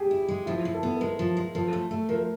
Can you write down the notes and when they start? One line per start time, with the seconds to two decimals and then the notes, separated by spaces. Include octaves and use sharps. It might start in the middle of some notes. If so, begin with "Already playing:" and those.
Already playing: G4 G#4
0.11 E4
0.28 G#3
0.46 F3 E4
0.65 F3
0.74 A4
0.83 B3
0.97 A4
1.01 G#3 A#4
1.19 F3
1.37 G#3
1.55 F3 A4
1.73 A3
1.91 A3
2.09 F3 A#4